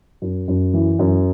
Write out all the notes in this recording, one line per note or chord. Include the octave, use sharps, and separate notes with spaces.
F#2
F#2
E3
F#2